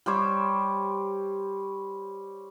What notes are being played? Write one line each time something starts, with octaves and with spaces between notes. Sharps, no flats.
G3 G4 C5 C#5